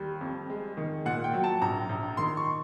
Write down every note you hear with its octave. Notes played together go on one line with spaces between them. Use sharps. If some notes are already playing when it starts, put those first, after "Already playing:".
Already playing: D#2 G3
F2
G#3
D#3
A#2 F#5
G5
F#3
A5
A#1 A#5
A#1
D#3 C6
C#6